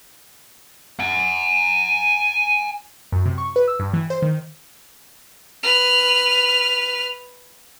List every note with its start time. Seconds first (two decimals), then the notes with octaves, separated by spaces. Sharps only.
0.99 F#5 G#5
3.12 F#2
3.26 C3
3.38 C#6
3.56 B4
3.68 E6
3.79 G2
3.93 E3
4.10 C5
4.22 D#3
5.63 B4 F6